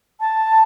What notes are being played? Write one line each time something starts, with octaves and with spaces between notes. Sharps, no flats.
A5